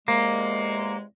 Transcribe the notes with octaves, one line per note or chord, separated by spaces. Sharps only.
E2 C3 G#3 A#3